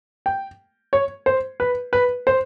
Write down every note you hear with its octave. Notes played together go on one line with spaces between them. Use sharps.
G5
C#5
C5
B4
B4
C5